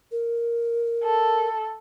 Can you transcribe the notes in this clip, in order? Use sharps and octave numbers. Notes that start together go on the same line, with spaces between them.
A#4
A4